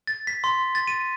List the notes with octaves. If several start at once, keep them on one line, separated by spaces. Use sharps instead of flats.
A6
B6
C6
A6
D#7